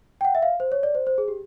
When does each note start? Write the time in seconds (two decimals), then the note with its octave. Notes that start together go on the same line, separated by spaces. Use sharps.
0.21 G5
0.25 F#5
0.35 E5
0.43 F5
0.60 C5
0.72 C#5
0.83 D5
0.95 C5
1.07 C5
1.18 G#4
1.28 G4